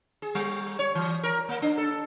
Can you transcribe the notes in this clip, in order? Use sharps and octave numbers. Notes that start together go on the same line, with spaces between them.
G#4
G3
C#5
E3
A#4
A#3
D4
A4